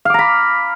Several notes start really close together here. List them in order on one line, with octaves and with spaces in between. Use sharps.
F5 D6 A#5 B5